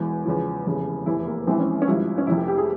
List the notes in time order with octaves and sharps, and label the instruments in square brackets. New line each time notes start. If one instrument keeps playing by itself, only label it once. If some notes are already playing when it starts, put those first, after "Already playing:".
Already playing: [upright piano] E1 E2 E3
E2 C#3 F3
F1 E2 C#3 E3
F1 E2 E3 E4
A#3
A#1 G#2 E3 C4
C#4
C#4
G#1 G2 F3 E4
C#4
F1 F2 C3 E4
G4
G4
G#4